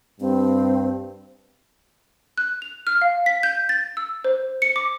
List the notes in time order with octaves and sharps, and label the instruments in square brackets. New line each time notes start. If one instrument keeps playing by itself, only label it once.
[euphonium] G2 [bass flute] C4
[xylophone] F#6
F7
F6
F5
B6
G6
A6
E6
C5
C#7
D6